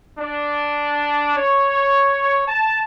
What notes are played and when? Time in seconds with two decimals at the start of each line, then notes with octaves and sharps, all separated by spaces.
0.19 D4
1.37 C#5
2.48 A5